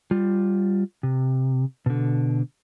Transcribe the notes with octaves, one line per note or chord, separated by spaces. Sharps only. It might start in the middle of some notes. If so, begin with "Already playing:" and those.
G3 F4
C3
B2 D3